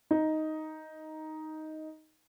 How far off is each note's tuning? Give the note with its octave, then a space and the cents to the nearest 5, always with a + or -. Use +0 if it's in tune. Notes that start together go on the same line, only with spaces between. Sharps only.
D#4 +5